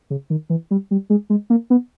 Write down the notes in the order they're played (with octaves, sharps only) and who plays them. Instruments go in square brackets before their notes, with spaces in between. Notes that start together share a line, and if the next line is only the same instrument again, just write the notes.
[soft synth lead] C#3
D#3
E3
G3
G3
G#3
G#3
A#3
B3